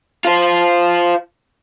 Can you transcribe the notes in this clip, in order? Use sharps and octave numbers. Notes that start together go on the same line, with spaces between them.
F4 C5